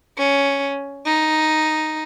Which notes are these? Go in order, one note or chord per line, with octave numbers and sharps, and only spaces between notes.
C#4
D#4